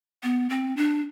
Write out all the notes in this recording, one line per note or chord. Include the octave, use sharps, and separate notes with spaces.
B3
C4
D4